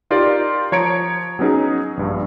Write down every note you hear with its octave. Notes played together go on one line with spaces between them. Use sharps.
D#4 F4 G4 A#4 D5
F3 C#5 A#5 G#6 C#7 D7
F#3 B3 C#4 D#4 G#4
A#1 G2